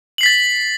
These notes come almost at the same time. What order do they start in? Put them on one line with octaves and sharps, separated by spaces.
F#7 C7 B6 A6